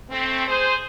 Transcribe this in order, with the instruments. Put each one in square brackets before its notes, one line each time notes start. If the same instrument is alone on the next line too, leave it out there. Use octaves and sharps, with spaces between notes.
[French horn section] A3 C4
G#4 C5